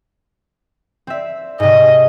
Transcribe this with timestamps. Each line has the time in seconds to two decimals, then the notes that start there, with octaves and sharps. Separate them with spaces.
1.07 C4 E5
1.60 G#2 C3 D#5